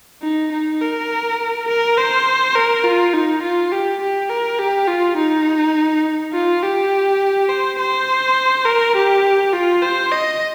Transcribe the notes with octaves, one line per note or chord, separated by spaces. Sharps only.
D#4
D#4
A#4
A#4
C5
A#4
F4
D#4
F4
G4
G4
A#4
G4
F4
D#4
F4
G4
C5
C5
A#4
G4
F4
C5
D#5